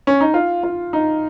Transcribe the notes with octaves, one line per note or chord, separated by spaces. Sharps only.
C#4
D#4
F4
F4
D#4